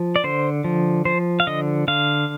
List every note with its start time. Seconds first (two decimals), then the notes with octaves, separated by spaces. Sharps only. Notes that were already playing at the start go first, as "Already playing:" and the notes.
Already playing: F3
0.16 D5
0.24 D3 C5
0.64 F3
1.05 F3 C5
1.40 F5
1.47 D3 D#5
1.88 D3 F5